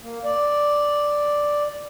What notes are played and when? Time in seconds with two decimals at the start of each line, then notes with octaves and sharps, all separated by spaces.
0.02 A#3
0.24 D5